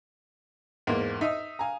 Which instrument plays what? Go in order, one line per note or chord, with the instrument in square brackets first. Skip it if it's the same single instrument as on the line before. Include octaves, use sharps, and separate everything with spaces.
[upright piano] E2 G#2 [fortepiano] A#3
[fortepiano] D#4 [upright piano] E5 D#6
[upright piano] F5 G#5 A#5